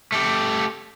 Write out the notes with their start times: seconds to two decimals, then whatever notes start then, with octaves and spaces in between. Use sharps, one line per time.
0.12 A3 G4